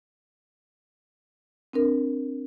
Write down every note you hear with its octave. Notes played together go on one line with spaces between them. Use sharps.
C4 D4 A#4